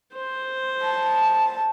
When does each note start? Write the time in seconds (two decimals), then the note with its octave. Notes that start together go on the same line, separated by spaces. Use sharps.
0.14 C5
0.82 A5